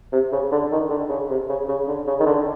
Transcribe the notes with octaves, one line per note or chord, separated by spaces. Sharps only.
C3
C#3
D3
D#3
D3
C#3
C3
C#3
C#3
D3
C#3
D#3
D3